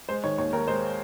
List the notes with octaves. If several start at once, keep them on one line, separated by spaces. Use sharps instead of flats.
G#3 C5
D#3 C#5
D#2 C#5
D#2 A#4
G#3 C5